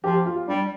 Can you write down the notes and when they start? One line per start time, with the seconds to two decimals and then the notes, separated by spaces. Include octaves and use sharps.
0.04 F3 G4
0.26 F4
0.48 G3 D4